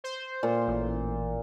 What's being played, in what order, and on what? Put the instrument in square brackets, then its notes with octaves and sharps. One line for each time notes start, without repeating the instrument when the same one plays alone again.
[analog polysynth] C5
[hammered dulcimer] A#2
[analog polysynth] A1